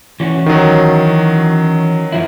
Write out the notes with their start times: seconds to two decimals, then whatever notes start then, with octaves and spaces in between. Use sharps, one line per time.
0.20 E3 C#4 F#4
0.46 D#3 F#3
2.12 F#2 F3 E4